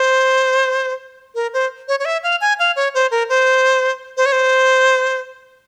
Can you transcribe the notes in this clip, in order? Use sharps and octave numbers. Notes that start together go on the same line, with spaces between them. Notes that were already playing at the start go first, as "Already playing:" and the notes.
Already playing: C5
A#4
C5
C#5
C#5
E5
F5
G#5
F5
C#5
C5
A#4
C5
C5
C#5
C5